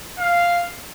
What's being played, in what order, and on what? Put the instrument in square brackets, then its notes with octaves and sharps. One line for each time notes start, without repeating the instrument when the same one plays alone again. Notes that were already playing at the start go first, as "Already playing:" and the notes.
[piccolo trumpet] F5